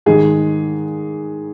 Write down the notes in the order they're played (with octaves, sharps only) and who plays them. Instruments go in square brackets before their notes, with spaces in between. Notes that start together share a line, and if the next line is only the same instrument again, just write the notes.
[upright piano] G#2 D#3 G#4